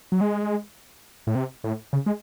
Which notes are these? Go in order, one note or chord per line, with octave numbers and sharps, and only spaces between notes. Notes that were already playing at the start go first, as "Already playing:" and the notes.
F#3
G#3
A2
C3
A2
C#3
G#3